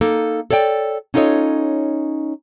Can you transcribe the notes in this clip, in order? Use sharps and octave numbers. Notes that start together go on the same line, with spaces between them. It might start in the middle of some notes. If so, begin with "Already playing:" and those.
A#3 D#4 A4
A4 C#5 D5 F#5 G5
C#4 D#4 F4 A4 C#5 D#5